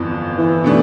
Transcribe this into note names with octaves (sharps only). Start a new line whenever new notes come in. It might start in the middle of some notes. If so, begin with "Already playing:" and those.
Already playing: G1 F2 E3
E3
B2 A3 D4